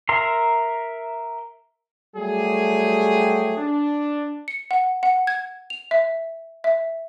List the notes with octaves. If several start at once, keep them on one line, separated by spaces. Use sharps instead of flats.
A#4 E5 A#5 C6
F#3 G3 A3 G4 G#4
D4
C#7
F#5
F#5
G#6
F7
E5
E5